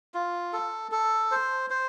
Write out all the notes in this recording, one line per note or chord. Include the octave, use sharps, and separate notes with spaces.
F4
A4
A4
C5
C5